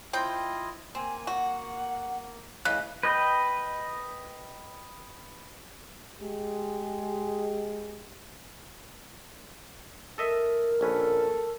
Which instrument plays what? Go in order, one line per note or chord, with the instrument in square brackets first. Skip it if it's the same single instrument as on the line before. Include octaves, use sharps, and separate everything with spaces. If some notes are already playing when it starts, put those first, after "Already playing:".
[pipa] C4 G5 [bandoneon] E4 F4 D#5
[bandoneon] A#3 [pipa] C4 [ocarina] G#5
[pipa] F#4 [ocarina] F#5
[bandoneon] A2 E3 [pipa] C#3 [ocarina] D#5 [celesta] F#6
[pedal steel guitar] B4 D#5 G5
[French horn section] G#3 G4
[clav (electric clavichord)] A4 D#5 E5 [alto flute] A#4
[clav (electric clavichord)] A#1 C#4 B4 [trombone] A4